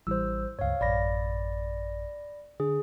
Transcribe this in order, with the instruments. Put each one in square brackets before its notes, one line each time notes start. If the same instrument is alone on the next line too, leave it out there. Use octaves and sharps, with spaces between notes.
[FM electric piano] A1 E3 G3 [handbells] C5 E6
[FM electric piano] C#2 G2 [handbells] C#5 F5
[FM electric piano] A1 F#2 [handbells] D5 B5 A#6
[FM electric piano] D3 [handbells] G#4